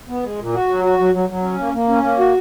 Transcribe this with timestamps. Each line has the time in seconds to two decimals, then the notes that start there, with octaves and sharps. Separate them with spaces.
0.08 B3
0.24 G#3
0.39 A#2
0.54 F#4
0.68 F#3
0.84 F#4
0.98 F#3
1.13 F#3
1.29 F#3
1.43 C#4
1.59 A#3
1.73 A#3
1.88 C#4
2.03 A#3
2.19 F#4